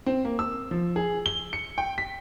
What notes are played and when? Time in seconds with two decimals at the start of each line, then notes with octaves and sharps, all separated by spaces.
0.06 C4
0.25 A#3
0.39 E6
0.71 F3
0.96 G#4
1.26 G7
1.53 C#7
1.78 G5
1.98 B6